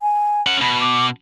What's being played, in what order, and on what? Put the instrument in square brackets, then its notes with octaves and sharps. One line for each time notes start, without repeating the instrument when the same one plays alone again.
[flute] G#5
[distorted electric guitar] C#4 F#5
[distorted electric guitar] B2 [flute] B5
[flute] D6